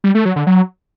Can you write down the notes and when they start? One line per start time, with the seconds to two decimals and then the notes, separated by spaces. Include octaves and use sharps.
0.04 G3
0.15 A3
0.25 F#3
0.36 D3
0.47 F#3